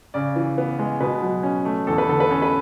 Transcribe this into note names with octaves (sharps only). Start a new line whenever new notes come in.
C#3 D5
E3
B3
G#3
B2 B4
F#3
C#4
A3
E2 A4
B4
D3 A4
B4
C#4 A4
B4